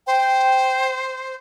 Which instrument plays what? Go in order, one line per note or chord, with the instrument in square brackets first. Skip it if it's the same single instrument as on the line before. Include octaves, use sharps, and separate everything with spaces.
[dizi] C5 [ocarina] G5